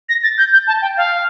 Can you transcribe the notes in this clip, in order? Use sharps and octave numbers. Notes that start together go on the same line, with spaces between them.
A#6
A6
G6
G6
A5
G5
F5